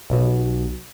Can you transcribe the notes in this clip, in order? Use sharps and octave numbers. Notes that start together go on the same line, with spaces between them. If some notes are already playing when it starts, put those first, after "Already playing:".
B1 B2